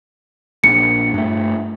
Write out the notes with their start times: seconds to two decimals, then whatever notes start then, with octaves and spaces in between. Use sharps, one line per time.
0.64 A#1 C#7
1.14 G2 A3